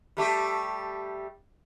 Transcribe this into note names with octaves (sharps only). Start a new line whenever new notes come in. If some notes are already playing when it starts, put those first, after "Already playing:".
G3 A3 G4